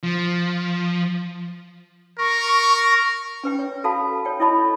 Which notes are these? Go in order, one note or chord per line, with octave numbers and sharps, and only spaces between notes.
F3
A#4 C#6
C#4 B4 G5
C#5
F#4 A4 F5 A5 B5
C#5 G5
E4 A4 C#5 D#5 A5 B5